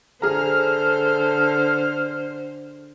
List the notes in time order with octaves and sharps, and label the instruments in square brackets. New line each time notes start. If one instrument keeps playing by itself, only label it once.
[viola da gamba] D3 C5 [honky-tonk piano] G#4 A#5 [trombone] A4 [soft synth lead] F6